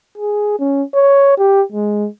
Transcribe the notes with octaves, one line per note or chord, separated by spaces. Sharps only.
G#4
C#4
C#5
G4
G#3